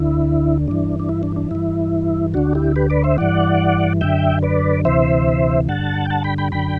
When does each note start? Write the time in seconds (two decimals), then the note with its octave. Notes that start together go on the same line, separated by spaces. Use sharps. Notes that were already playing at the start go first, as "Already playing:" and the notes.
Already playing: D2 D3 E4
0.67 G2 E3 D4
1.00 D4
1.09 E4
1.23 D4
1.36 D4
1.51 G2 E3 E4
2.34 D2 D3 D4 F#4
2.55 E4 G4
2.76 G4 B4
2.90 B4 D5
3.04 C5 E5
3.18 G2 E3 D5 F#5
4.01 F#2 D3 E5 G5
4.43 B4 D5
4.85 D2 C3 E3 C5 E5
5.69 G2 D3 F#5 A5
6.05 G5
6.10 F#5 A5
6.24 G5 B5
6.38 G5 B5
6.52 F#2 D3 G5 B5